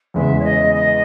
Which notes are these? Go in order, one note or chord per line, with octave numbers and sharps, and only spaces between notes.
E2 C#3 G#3 B3 E5
C#5
D#5
D#5